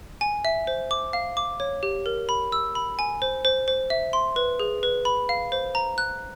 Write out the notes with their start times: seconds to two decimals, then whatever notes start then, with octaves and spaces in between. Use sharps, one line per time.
0.21 G#5
0.45 E5
0.67 C5
0.91 D6
1.13 F5
1.37 D6
1.60 C#5
1.83 G4
2.06 A#4
2.29 B5
2.52 E6
2.75 B5
2.99 G#5
3.22 C5
3.45 C5
3.68 C5
3.90 E5
4.13 C6
4.36 B4
4.60 G#4
4.83 B4
5.05 B5
5.29 F5
5.52 C5
5.75 A#5
5.98 F#6